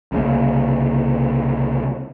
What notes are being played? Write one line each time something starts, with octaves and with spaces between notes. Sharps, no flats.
C2 C#3 A#3